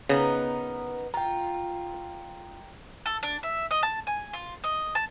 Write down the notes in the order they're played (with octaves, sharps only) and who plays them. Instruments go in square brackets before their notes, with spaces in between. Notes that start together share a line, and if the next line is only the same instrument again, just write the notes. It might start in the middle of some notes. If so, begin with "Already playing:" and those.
[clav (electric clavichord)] C#3 [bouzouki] B3 D#4 A#4
[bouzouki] F4 [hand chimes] G5 A#5
[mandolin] A4
D4
E5
D#5
A5
G#5
F4
D#5
A5